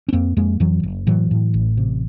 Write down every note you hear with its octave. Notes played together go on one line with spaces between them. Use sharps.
C#4
F2 A#3 C4
F2 G#3 A#3
F2 E3 F#3
F#1
A2 E3 F#3
A2
A1
C3